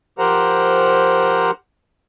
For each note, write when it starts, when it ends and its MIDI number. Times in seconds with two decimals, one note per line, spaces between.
0.19 1.51 53
0.19 1.51 67
0.19 1.51 70
0.19 1.51 72
0.19 1.51 78
0.19 1.51 82